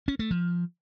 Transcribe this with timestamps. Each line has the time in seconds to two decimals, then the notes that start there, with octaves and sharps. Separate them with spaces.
0.08 C#4
0.19 A3
0.31 F3